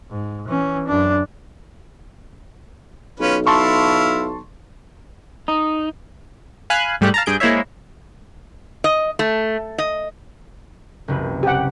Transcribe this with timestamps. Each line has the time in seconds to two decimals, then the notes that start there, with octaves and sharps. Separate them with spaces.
0.11 G#2
0.48 E3 C#4
0.88 F#2 D4
3.20 B1 C#4 F4 B4
3.47 E4 F5 A5 C6 C#6
5.48 D#4
6.70 F5 G#5 B5 F#6
7.01 G#2 G3 A3 G4 F#6
7.14 F5 A5 A#5
7.26 G2 G#4 G6 D7
7.40 G#3 A#3 E4 C5 C#5 E5
8.84 D#5
9.19 A3
9.78 D#5
11.08 F#1 C2 B4
11.43 G4 F#5